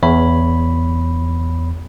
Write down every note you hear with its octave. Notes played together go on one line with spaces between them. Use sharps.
E2 C#5 B5